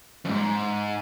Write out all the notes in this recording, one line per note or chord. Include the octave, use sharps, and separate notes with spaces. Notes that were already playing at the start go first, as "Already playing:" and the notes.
F2 G#2